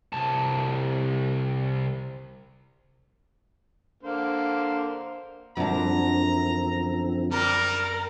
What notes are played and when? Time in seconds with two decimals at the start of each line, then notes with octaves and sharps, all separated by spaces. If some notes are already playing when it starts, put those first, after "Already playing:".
0.13 C2 A5
4.03 D3 A#3 C5
5.57 F#2 D3 F3 C4 D4 A#5
7.32 G3 A#4